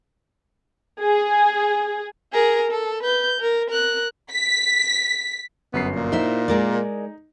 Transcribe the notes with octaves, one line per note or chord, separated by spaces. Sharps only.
G#4
G#4 A#4
A4
B4 G6
A#4
A#4 F#6
B6
G1 F#2 B3 C7
A#2
D#4 E4 C5 E5
G#3 A#4 D5